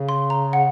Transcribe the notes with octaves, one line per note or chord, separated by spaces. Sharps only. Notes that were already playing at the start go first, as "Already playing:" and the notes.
Already playing: C#3
C6
A#5
F#5